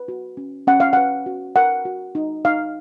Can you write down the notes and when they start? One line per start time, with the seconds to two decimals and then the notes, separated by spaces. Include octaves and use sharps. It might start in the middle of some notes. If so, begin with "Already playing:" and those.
Already playing: B4
0.08 F#4
0.37 C#4
0.67 C#4 F#5
0.80 F5
0.93 B4 F#5
1.26 F#4
1.56 A#4 F#5
1.85 F#4
2.15 D#4
2.45 D#4 F5